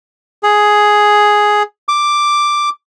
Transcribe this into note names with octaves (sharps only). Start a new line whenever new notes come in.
G#4
D6